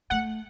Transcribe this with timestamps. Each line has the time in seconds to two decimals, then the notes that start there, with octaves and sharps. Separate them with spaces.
0.10 A3 F#5